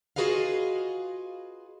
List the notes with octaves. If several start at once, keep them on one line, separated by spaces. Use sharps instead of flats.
F4 F#4 G#4 B4 D#5 F5